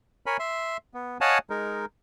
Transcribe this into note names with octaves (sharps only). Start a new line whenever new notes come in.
A#4 C#5 G#5 B5
E5 C6
B3
C#5 D#5 F5 F#5 G#5 A5
G#3 D#4 A#4